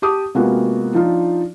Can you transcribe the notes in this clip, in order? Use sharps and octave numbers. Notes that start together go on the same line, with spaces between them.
G4 A5 D6 D#6
C3 G#3 A#3 B3 F4 F#4
F3 D4 D#4 F4